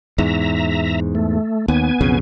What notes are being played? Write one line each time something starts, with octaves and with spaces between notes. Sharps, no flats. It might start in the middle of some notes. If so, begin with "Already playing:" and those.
E2 G#2 E5 A#5
A3
D#2 B3 G#5
B1 F2 C#3